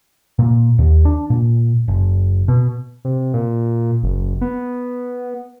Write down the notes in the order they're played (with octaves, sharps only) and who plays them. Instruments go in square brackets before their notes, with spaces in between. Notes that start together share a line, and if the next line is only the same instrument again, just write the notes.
[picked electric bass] A#2
D#2
D4
A#2
F#1
B2
[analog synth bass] C3
A#2
F#1
B3